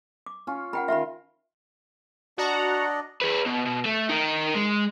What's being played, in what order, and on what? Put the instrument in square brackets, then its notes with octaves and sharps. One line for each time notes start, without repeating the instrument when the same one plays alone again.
[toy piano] D6
[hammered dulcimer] C#4 F4
[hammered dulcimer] A#4 [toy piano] F#5 G5 B5
[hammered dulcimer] D#3 F4 C6 [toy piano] E5 B5
[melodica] D4 D5 D#5 [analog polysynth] F#4 F#5 A#5
[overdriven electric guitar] G#4 B4
B2
B2
A3
D#4 A#4
G#3